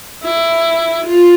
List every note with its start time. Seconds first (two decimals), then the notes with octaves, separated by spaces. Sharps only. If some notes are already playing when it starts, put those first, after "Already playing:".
0.23 E4
1.06 F4